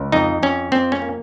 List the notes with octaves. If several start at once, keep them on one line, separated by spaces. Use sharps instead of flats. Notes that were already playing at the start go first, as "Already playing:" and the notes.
Already playing: C#2
F2 D#4
F2 C#4
F2 C4
C#4
A#3